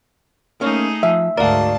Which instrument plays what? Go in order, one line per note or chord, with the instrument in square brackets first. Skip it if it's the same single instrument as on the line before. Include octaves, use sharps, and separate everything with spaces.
[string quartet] A3 D#4 G#4 [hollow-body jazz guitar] A#3 C#4 C#5
[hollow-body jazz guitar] F3 [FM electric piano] E5
[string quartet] D2 G#2 A5 [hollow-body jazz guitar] F#4 A#4 [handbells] D5 F5